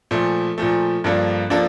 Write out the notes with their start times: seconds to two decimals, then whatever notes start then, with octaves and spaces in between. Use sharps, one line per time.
0.11 A#2 F3 A3
0.58 A#2 F3 A3
1.04 G2 F3 A#3 D4 A4
1.50 F3 A#3 D4 A4